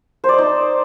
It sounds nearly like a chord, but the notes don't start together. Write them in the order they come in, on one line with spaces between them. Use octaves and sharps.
C5 D5 D#5 D#4